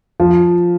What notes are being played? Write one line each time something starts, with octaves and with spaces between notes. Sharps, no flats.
F3